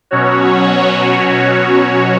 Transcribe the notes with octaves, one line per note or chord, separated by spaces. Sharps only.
B2 F#3 C#4 F#4 C#5